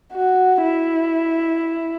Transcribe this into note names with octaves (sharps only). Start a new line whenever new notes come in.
F#4
E4